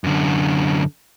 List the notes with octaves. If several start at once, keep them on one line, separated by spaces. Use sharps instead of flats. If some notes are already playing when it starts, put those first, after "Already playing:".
F#2 D3